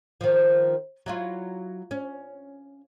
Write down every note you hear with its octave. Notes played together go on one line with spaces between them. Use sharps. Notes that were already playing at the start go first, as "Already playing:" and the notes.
D#3 F3
F#3 E4 F4
C#4